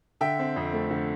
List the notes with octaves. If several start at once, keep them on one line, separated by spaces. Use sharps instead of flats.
D3 E5 G5
C4
F2
A3
D3